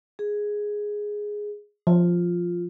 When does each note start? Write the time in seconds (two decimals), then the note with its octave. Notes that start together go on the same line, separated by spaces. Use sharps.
0.19 G#4
1.87 F3 F4